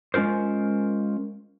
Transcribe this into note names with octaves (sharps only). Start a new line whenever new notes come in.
G#3 C#4 F4 A#4 C5